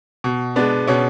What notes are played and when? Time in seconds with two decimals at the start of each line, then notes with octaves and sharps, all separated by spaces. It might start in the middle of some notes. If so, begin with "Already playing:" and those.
0.24 B2
0.56 G#3 B3 D4
0.88 B2 C#4